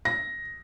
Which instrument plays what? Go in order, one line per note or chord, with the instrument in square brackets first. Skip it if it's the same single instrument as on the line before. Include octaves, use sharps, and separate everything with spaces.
[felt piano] A#6